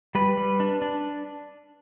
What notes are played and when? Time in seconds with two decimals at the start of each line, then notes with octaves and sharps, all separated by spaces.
0.15 G3 B4
0.37 G3
0.60 D4
0.82 D4